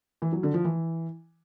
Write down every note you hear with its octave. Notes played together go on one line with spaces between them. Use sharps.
E3
F#3
D3
F3
E3